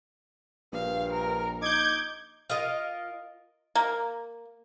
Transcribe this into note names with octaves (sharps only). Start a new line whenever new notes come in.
A#1 G2 F5
A#4
D#4 D6 G6 G#6
F4 A#4 D#5 F5
A#3